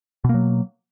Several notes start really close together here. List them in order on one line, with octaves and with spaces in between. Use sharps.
B2 A#3 F#3